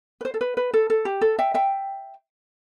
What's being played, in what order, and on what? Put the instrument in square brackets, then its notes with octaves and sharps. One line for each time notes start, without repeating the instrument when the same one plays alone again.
[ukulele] B4
C5
A4
B4
B4
A4
A4
G4
A4
E5 G5
E5 G5